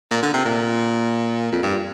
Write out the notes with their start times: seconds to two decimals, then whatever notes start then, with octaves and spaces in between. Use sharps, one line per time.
0.11 A#2
0.23 D3
0.34 C3
0.45 A#2
1.52 F2
1.63 G2